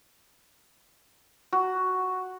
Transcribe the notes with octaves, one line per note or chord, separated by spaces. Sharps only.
F#4